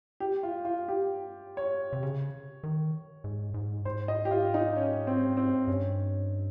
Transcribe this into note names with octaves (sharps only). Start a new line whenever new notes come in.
G4
F4
F4
G4
C#5
C3
C#3
D#3
G#2
G#2
G#2 C5
D#5
G4
F4
D#4
C#4
C4
C4
G2 C#4